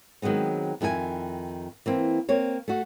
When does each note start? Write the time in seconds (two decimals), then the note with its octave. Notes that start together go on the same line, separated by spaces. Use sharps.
0.22 D#3 F#3 G#3 B3 C4
0.81 F2 D#3 E4 G#4 G#5
1.86 E3 A#3 C4
2.29 A#3 C4 C#5
2.68 A3 F#4